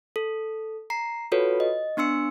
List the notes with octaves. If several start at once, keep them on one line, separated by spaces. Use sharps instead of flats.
A4
A#5 C7
F4 F#4 A4 B4 C#5
D#5
B3 D4 C6 E6 C#7